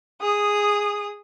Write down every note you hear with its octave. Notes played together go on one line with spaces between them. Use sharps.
G#4 D#6